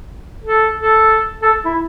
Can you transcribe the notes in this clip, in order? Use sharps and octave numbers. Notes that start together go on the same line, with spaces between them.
A4
A4
A4
E4